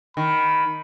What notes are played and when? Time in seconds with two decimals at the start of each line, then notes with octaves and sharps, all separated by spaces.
0.17 D#3 B5